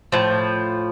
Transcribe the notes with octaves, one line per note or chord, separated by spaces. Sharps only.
A2 F3